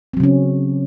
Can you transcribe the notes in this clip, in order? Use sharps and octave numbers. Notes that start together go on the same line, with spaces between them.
C#3 F#3 C4 C#4